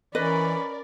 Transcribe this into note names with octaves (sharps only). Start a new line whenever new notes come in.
E3 C#4 A#4 B4 D5 D#5 B5